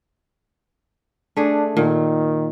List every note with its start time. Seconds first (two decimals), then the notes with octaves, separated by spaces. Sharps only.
1.36 A3 D4 G#4
1.77 A#2 D#3